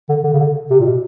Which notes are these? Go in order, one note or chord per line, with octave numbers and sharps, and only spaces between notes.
D3
D3
C#3
D3
C3
A#2
B2